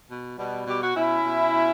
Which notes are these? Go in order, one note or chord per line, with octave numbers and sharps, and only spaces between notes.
B2
B2 G3
B2 G4
F#4
B2 C#4 E4
B2
B2